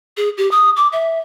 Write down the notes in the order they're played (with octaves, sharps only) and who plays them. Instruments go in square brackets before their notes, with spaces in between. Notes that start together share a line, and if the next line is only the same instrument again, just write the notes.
[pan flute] G#4
G4
D#6
D6
E5